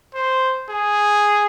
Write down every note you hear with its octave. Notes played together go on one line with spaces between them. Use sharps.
C5
G#4